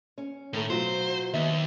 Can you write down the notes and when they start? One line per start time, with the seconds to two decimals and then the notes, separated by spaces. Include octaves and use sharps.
0.18 C#4
0.53 A2 D#3 A3
0.70 B2 F#3 F4 C5
1.34 D#2 B3 D#4 E5